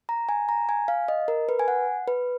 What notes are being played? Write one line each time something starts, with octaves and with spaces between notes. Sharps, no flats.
A#5
G#5
A#5
G#5
F5
D#5
A#4
B4
G#5
F#5
B4